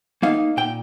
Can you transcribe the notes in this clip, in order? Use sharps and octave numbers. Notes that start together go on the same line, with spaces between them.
A#3 D#4 F5
A#2 G5